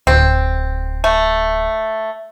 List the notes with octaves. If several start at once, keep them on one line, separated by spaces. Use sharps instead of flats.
D1 C4
A3